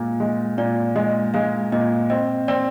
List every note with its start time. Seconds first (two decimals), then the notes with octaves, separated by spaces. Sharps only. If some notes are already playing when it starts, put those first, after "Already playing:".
Already playing: A#2 G#3
0.20 G#3
0.58 A#2 D5
0.96 G#3 D#5
1.34 G#3 F5
1.72 A#2 D#5
2.10 C4 D#5
2.48 C4 D5